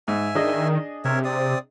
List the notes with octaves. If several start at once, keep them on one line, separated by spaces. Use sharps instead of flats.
G#2 E5 G#5
D#3 D4 G#4 D#5
C3 A#4 C#5 E5
C4 D5 D#6